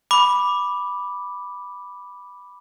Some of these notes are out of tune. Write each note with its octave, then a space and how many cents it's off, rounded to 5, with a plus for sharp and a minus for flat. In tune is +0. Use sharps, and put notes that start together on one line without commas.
B5 -5 D6 +0